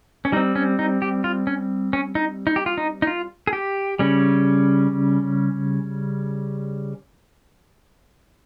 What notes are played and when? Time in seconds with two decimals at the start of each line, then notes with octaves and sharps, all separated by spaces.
0.25 C#4
0.32 G3 D#4
0.36 C4
0.55 C#4
0.79 D#4
1.02 G4
1.24 F4
1.47 C#4
1.93 C#4
2.15 D#4
2.47 D#4
2.56 G4
2.66 F4
2.78 D#4
3.02 D#4
3.07 F4
3.47 G#4
3.53 G4
3.99 C#3 G3 C#4